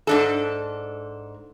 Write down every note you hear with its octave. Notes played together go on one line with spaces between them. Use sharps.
G#2 D4 A4